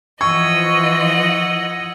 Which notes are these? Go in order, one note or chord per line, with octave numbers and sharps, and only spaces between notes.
E3 F3 D#5 F#5 C#6 E6 G#6